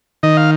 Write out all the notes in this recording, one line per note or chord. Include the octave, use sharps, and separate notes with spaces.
D#3 D#5
F5